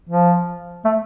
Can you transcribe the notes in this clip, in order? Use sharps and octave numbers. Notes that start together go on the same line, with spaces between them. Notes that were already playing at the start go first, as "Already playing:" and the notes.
F3
A3